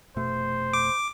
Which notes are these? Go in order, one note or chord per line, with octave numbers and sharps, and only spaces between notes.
F1 B2 A3 C5
D6